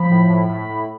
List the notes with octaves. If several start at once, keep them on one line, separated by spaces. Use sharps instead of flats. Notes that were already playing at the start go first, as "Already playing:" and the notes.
Already playing: F3 B5
A2
A2
A2
A2